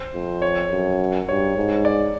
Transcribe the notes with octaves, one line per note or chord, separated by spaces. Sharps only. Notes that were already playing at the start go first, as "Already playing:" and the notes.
Already playing: C5
F2
C#5
F#2
G2 C#5
G#2
D5